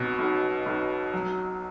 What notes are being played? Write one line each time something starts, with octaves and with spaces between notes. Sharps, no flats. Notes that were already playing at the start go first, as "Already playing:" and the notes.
Already playing: B1 B2
B1
B1
F#3